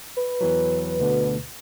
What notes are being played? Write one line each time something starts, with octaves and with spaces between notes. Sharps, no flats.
B4
E2 E3 F#3
D2 B2 D3